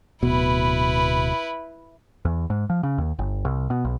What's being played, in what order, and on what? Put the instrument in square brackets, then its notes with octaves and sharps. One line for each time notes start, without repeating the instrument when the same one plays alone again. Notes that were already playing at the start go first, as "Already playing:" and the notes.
[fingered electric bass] D1 B2 [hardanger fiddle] E4 B4
[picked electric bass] E2
G#2
F3
C#3
D#2
G1
C2
B2
B1